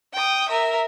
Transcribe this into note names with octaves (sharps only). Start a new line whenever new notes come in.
G5 D#6
A#4 E5